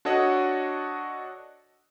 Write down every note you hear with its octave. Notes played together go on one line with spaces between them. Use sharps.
D4 F#4 A4 C#5 D#5 F#5